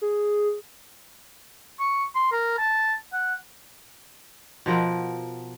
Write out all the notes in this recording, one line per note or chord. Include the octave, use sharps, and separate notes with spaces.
G#4
C#6
C6
A#4
A5
F#5
B2 F3 A#4 F#5